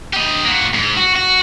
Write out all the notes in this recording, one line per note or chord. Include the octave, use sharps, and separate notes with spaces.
G4 D#5
A#3 F#4
G#2
F#4
F#4